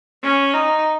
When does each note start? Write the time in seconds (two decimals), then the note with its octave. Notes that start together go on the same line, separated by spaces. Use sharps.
0.23 C#4
0.54 D#4